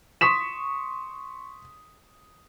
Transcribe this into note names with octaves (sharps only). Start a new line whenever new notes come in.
C6 C#6 D#6 B6 E7